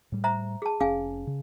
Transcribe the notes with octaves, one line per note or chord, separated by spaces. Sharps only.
A2 G3
C5 E5 A#5
G#4 A5
F1 C#4 G#4 F5 G#5
C#3